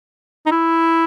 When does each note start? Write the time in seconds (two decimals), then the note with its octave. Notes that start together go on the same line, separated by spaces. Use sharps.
0.46 D#4
0.52 E4